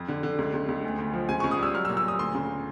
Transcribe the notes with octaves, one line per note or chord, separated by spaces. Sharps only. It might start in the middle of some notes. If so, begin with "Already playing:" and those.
Already playing: F2
D3
D3
C#2
C#2
C#2
D2
D2
F3
C#2 G#5
C#2 C#6
D#6
G3 E6
F#3 F6
E6
A#2
E6
A#2 D#6
D2 C6
C#3